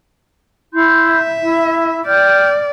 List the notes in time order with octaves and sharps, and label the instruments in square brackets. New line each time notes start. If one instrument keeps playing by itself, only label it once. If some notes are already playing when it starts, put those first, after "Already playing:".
[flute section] E4 C6 G6
[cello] E5
[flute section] E4
[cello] D5 [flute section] G5 F6 G6